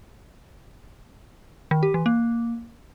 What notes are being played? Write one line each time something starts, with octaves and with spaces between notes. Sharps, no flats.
D#3
G4
E3
A#3